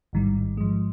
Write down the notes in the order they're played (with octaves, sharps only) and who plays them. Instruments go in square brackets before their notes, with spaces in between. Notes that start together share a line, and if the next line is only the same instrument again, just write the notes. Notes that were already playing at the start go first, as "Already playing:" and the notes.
[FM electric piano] A1 G#2 D#3 G3
G#2 F3 G#3